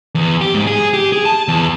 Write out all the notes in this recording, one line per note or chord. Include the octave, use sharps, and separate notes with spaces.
E2
G4
G#2
G#4
G4
G#4
A5
E2